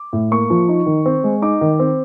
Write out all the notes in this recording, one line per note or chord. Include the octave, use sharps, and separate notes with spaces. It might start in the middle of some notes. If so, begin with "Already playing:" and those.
Already playing: D6
A2
A#3 C#6
F3
D#4
D#3
C4
G#3
D#4 D6
D#3
C4